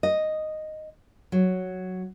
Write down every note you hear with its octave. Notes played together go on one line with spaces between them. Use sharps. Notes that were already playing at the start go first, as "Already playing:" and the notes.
D#5
F#3